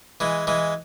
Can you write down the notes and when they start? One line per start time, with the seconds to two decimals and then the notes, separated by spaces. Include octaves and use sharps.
0.20 E3 G#3
0.47 E3 G#3